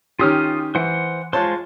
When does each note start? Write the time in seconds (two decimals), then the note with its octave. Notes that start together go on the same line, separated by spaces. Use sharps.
0.19 D#3 C#4 F4 G4 D#6 F6
0.75 E3 C5 F#5
1.33 G#3 F4 C5 C#5 A5